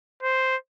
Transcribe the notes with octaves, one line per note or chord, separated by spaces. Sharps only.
C5